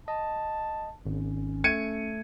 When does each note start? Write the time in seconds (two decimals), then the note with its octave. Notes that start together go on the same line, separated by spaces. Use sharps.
0.08 D#5 A5
1.06 G#1 C#4
1.64 A3 G#6 C#7 D#7